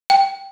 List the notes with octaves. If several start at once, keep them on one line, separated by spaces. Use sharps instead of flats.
G5